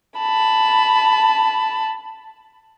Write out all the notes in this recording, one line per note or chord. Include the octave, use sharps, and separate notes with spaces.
A5 B5